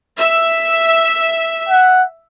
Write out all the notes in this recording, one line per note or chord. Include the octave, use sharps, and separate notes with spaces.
E5
F#5